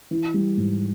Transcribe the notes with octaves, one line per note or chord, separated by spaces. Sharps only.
E3
G3
G#2